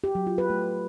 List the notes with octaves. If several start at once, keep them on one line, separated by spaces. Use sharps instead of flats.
G4
F#3
F4
B4
A3